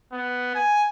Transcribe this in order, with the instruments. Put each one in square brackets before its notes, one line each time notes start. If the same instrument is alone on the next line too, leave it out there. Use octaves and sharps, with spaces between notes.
[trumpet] B3
G#5